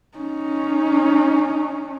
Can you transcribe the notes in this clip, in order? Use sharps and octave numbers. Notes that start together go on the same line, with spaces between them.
C#4 D#4